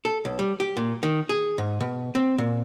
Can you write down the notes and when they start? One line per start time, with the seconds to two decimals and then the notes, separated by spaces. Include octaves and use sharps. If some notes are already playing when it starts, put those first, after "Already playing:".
0.05 A4
0.25 B1
0.39 G3
0.60 G4
0.77 A#2
1.03 D#3
1.29 G#4
1.58 G#2
1.81 B2
2.15 C4
2.38 A#2